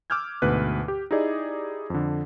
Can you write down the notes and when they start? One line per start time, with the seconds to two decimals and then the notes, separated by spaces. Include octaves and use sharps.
0.10 D6 E6 F6 G6 G#6
0.42 D2 G#2 B2 B4 F#6
0.88 G4
1.11 D#4 E4 G4 G#4 D5 D#5
1.90 F2 D3